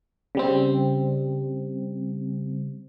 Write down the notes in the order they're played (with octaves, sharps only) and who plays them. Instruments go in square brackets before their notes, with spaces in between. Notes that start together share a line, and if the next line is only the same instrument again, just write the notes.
[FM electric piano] C#3 G3 C4